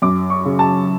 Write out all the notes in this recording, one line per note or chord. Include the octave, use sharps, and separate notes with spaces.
F#2 D6
C#6
C#3
A5